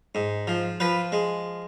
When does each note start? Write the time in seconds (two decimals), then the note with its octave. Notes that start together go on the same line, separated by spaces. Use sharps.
0.15 G#2
0.47 F3
0.80 F3 B4
1.12 G#3